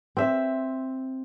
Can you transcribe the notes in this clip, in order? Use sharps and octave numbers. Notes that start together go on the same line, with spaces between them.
C4 E5